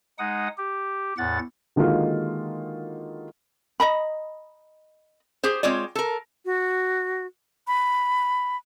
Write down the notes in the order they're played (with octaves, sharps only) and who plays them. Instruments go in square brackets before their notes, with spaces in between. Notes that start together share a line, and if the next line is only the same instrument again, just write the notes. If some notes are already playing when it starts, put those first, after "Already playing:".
[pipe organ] G#3 D#4 F#5 D#6
G4
E2 A2 F#5 A6
[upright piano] D3 D#3 G#3 A#3 F4 F#4
[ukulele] D#5 A#5 B5
[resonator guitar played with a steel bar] G4 G#4 C5
G#3 C4 F4 C#5 D5
A4 A#4
[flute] F#4
B5